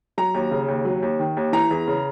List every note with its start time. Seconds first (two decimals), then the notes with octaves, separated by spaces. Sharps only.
0.18 F#3 A#5
0.34 D#2
0.51 C#3
0.68 D#2
0.85 F#3
1.03 D#2
1.19 D#3
1.37 D#2
1.53 E3 A#5
1.71 E2
1.88 C#3